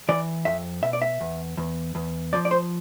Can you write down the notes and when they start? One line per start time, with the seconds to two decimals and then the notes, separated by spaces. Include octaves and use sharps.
0.09 E3 D5
0.45 F2 E5
0.83 B2 E5
0.93 D5
1.02 E5
1.21 E2
1.57 E2
1.95 E2
2.33 F3 D5
2.45 D5
2.51 C5